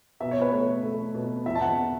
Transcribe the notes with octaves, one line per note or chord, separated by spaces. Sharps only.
B2 E5
C#5
B4
A3 C#5
A3
B2
E2 E5
A5
F#5